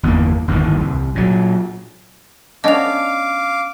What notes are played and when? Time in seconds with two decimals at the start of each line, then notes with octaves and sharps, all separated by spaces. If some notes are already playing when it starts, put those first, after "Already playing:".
0.03 G1 E2 G2 A#3
0.48 G1 D#2 A2 E3
0.81 C2
1.15 A#2 F#3
2.64 B3 C#4 D4 D#5 F5 D6 F7